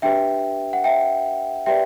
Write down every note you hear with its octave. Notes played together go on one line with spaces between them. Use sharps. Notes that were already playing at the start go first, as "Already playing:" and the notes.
D4 G4 B4 E5 G5
F#5
E5 G5
G4 B4 D5 E5 G5